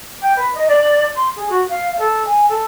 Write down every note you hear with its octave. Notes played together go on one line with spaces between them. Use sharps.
G5
B4
D#5
D5
C6
G#4
F#4
F5
A4
G#5
A4